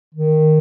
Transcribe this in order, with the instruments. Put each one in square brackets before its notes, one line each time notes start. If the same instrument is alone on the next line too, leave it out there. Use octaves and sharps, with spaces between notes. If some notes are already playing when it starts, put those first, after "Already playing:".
[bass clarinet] D#3